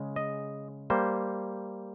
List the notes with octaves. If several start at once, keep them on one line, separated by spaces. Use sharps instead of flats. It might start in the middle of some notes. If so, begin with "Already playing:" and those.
Already playing: C#3 G#3
D#5
G3 A#3 C5